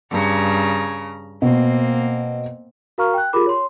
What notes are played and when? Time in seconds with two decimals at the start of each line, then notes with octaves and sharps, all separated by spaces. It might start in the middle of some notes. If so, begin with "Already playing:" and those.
0.11 G2 C#3 A#5
1.42 B2 A#3 C4
2.98 F#4 A#4 F5 A#5 C#6 F6
3.14 G5 F#6
3.33 F4 G4 G#4 A#4 B5 D6
3.46 C#5 C6